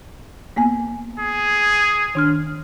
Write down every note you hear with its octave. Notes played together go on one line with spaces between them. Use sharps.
A#3 B3 G#5
G#4
D#3 D4 F6